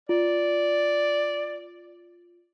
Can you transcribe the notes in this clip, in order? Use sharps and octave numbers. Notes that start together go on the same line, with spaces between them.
F4 D5